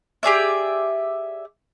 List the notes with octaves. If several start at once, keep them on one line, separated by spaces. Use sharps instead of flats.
G4 G#4 D5 E5